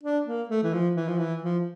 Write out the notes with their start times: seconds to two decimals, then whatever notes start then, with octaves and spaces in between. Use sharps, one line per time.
0.03 D4
0.26 A#3
0.49 A3
0.63 E3
0.73 F3
0.95 E3
1.08 F3
1.18 E3
1.42 F3